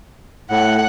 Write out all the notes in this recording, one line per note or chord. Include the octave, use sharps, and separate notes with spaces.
A2 F#5